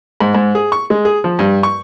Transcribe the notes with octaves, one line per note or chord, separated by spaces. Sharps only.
G#2
G#2
G#4
C#6
G#3
G#4
F3
G2
C#6